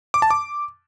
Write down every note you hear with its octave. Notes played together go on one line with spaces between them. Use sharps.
D6
A5
D6